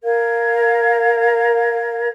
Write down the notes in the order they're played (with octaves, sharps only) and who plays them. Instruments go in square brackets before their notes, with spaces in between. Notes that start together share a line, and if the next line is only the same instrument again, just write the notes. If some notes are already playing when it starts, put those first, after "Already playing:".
[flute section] A#4 F5 G#6